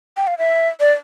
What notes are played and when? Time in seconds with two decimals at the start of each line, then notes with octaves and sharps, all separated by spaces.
0.17 G5
0.27 F5
0.38 E5
0.80 D5